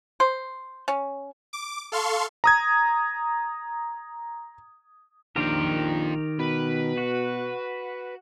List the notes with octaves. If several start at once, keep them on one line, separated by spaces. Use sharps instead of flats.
C5
C#4
D6
A4 F5 C6 C#6
A#5 D#6 G#6
A#1 D#3 F4 G4 A#4 G5
B2 B4
F#4